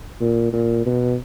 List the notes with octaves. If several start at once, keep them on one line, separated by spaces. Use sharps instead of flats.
A#2
A#2
B2